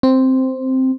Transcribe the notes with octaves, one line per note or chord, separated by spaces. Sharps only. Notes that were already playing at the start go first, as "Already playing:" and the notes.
C4